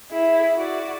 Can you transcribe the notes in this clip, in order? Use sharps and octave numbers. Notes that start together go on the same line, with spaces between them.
E4 G#4
F#4 D5